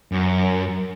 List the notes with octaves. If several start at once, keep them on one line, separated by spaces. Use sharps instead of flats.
F#2